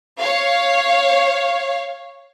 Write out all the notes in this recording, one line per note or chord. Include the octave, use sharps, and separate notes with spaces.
C#5 F5